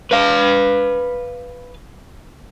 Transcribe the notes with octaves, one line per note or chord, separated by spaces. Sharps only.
B4 F5